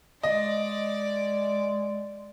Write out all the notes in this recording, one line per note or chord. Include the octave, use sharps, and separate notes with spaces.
G#3 D5 D#5